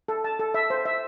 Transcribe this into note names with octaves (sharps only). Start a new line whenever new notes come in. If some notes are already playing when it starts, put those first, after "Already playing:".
A4
A5
A4
E5
C5
E5